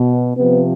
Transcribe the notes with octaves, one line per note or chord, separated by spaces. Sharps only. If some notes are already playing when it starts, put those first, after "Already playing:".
Already playing: B2
C3 F3 B3